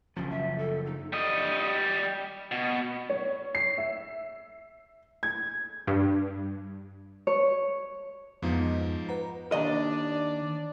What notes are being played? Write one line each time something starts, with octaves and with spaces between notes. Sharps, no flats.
F#1 F3 C#4
E5
A4
D#4
G3 D#5
B2
C#5
C7
E5
G#6
G2
C#5
F2 G#2 F3 B3 D#4 D#5
B4 F#5 A#5
D#2 D4 D5 D#5